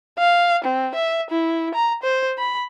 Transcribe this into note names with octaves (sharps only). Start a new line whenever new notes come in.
F5
C4
E5
E4
A#5
C5
B5